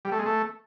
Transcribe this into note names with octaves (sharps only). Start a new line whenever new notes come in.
G3
A3
G#3
A3